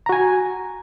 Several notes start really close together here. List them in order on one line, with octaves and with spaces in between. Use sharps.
A#5 F#4 G#5